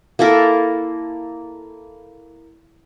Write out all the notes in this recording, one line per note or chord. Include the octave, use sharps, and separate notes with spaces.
A#3 E4 A4 A#4